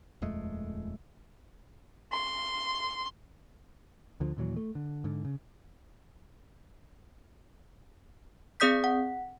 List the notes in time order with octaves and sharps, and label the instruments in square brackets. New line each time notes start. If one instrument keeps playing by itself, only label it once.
[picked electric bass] D#1 F2 G#3 A3
[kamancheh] C6
[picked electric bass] D2 D3 F3
D#2 A#2 E3 F#3
A3
D3
G#2 D3
C#3
[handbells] C4 G#4 D5 D#6 G6 B6
F#5